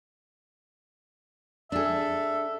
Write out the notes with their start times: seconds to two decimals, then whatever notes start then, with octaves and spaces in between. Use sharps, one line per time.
1.72 D4 G#4 A4 E5